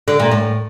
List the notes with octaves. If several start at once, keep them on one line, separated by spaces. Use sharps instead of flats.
D3
A#2
A2